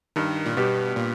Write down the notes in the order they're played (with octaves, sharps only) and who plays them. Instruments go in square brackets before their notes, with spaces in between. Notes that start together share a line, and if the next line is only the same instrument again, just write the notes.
[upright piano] G2 [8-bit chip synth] D#3
[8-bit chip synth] A#2
[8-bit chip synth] B2 [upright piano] G3 B3 G4
[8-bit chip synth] A#2